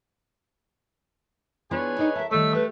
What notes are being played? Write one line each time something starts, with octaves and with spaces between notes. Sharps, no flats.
B3 D4 F4 G#4 B4 C#5
D4 D#4 A#4 D#5
A4 A#4 E5
D#3 G3 A3 C#5 E6
G4 B4